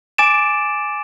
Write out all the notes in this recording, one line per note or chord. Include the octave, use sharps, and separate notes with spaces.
G#5 D6 A6 D7 E7